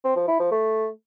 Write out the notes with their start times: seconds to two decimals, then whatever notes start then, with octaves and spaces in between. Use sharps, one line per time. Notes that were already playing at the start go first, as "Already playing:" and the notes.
0.04 C4
0.16 F3
0.28 E4
0.40 F3
0.52 A3